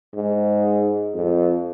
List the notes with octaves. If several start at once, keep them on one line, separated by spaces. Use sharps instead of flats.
G#2
F2